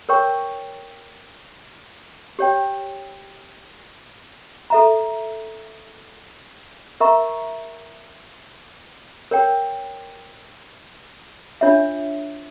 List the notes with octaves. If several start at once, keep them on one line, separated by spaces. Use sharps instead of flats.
A#4 C#5 G5 C#6
G4 C#5 G5
A4 E5 A#5
A#4 E5 A#5 C#6
A#4 C#5 G5
D4 F4 C#5 E5